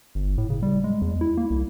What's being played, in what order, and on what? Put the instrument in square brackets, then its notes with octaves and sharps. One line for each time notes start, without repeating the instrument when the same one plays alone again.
[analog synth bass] G1
A2
C#3
G3
G#3
E2
E4
A#3
C2